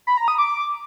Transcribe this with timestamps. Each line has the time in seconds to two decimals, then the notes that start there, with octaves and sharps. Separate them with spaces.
0.07 B5
0.17 A#5
0.28 D#6
0.38 D6